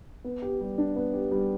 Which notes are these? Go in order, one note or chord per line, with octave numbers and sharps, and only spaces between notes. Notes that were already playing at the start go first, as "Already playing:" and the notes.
B3
G4
G3
D4
B3
G4
G3